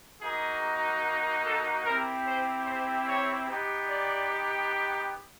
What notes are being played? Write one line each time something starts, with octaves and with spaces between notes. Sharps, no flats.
A#3 D#4 F#4 G#4
A4
C4 E4 G4 A#4
C5
C5
C#5
B3 D#4 G4
D5